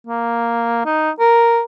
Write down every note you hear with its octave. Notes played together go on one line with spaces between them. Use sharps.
A#3
D#4
A#4